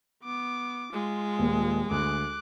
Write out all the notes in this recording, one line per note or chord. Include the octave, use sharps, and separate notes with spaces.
B3 D6
G#3 F4
D#1 A#2
D2 D6 F#6